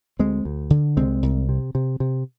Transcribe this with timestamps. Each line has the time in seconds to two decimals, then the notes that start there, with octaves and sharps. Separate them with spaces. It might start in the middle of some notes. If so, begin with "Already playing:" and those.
0.19 D2 G#3 C4
0.45 D2
0.70 D3
0.97 C2 G#3 C4
1.23 C2
1.49 C3
1.75 C3
2.00 C3